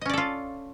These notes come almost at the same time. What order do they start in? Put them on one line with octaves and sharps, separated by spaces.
D#5 C#4 D5 A4 F4